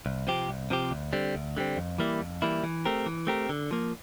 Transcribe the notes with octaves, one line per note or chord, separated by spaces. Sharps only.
C2
C3 F3 C4 G4
C2
C3 F3 C4 G4
D2
D3 G3 C4
D2
D3 G3 C4
F2
E3 G3 A#3 E4
F2
E3 G3 A#3 E4
E3
A3 C4 G4 A#4
E3
A3 C4 G4 A#4
D3
F3 A#3